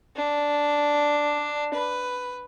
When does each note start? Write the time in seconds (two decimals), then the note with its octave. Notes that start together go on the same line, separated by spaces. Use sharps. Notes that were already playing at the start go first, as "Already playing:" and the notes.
0.16 D4
1.74 B4